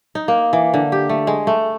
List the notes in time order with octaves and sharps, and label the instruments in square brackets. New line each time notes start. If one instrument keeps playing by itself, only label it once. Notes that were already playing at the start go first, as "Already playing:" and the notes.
[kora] D#4
A#3
E3
D3
G4
A3
G#3
A3